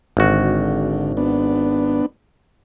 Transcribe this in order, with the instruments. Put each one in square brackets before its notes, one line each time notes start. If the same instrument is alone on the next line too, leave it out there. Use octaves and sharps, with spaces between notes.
[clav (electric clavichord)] G#1 F#4 [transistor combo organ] D3
[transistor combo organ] B3 D4